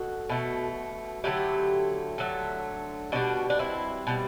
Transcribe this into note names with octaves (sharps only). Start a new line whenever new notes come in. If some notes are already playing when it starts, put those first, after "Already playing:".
Already playing: B2 F#4 A4
B2 A3
D3 F#3 A3 E4 G4
D3 F#3 A3
B2 G3 D4 F#4
D4
C4 E4
B2 G3